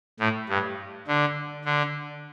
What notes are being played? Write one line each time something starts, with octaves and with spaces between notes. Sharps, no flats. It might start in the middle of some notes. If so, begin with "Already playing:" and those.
A2
G2
D3
D3